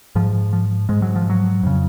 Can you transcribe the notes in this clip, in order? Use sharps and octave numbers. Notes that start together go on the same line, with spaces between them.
G#2 F3
F3
G#2 G#3
F#3
F3
F#3
F2 C#3